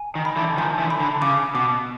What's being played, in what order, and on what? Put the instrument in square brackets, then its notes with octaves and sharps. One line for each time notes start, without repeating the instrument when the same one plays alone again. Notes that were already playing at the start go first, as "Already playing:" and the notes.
Already playing: [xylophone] G#5
[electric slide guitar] D#3
[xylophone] B5
[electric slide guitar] D3 E3
[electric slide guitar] D#3 F3 [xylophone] G#5
[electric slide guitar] D3 E3
[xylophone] B5
[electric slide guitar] D3
[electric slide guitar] C#3 [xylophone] D6
[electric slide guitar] B2 [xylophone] D6